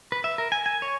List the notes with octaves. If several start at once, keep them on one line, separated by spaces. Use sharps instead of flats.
B4
E5
A#4
G#5
G#5
C#5